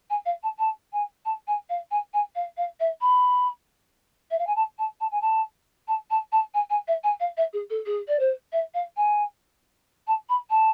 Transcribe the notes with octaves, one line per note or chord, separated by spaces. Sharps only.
G#5
F5
A5
A5
G#5
A5
G#5
F5
G#5
G#5
F5
F5
E5
B5
E5
F5
G#5
A5
A5
A5
G#5
A5
A5
A5
A5
G#5
G#5
E5
G#5
F5
E5
G#4
A4
G#4
D5
C5
E5
F5
G#5
A5
B5
A5